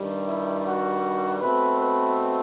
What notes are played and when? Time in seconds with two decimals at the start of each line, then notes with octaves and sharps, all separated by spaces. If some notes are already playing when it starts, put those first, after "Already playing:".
Already playing: G2 D#3 G3
0.27 E4
0.65 F#4
1.41 B2 A3 C4 B4
1.80 B4